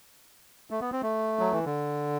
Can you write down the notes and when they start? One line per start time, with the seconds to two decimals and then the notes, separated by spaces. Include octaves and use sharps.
0.71 A3
0.81 B3
0.92 C4
1.02 A3
1.39 F#3
1.52 E3
1.65 D3